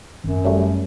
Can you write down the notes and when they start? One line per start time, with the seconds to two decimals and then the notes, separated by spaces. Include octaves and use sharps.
0.24 G#1 F#2
0.45 F#3 G3 A3